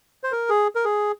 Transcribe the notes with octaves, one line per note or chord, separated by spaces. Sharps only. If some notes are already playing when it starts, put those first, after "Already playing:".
C5
A#4
G#4
A#4
G#4